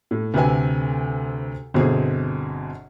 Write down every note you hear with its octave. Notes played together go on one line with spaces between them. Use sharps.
A2
D2 C3 B4 E5 G#5
G1 B2 C4 G#4